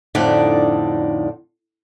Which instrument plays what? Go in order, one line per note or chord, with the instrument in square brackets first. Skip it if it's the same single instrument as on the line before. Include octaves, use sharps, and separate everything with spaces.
[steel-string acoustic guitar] F2 A2 D3 D4 D#4 D5